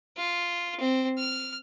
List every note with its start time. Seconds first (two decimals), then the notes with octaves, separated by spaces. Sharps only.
0.17 F4
0.80 C4
1.18 F6